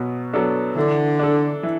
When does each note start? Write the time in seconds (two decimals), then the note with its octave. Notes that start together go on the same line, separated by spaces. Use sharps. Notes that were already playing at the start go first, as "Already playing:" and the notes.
Already playing: B2 F#3 B3
0.33 F#3 B3 D4 A4
0.76 D3 E3
1.19 D4 A4
1.63 E3